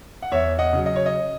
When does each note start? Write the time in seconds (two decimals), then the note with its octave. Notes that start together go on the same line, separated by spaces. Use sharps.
0.22 F#5
0.32 E2 C#5 E5
0.59 D#5 F#5
0.73 C#3 F#3
0.86 D#5
0.96 C#5
1.06 D#5